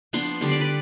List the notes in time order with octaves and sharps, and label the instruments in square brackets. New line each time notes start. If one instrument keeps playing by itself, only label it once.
[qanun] F3 B3 D4 C6
D3 G3 D4 C6
D5
B4